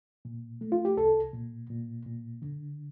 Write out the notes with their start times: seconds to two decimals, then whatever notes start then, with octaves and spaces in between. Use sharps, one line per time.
0.25 A#2
0.61 A3
0.72 F4
0.85 G4
0.97 C2 A4
1.33 A#2
1.70 A#2
2.06 A#2
2.42 D3